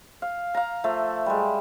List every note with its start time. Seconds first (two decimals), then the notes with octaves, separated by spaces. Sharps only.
0.22 F5
0.54 F5 A#5
0.84 F3 A3 E5
1.26 G3 G#3